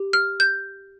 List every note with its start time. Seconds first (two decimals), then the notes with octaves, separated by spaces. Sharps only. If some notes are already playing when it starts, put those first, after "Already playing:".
Already playing: G4
0.13 F6
0.40 G6